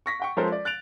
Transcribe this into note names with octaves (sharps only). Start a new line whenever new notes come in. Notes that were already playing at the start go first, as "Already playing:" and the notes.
C#6 A#6 B6
F#5 G5 C#6
F3 G#3 C#4 A4 A#4 C5
D5
F#6 A6 D7 F7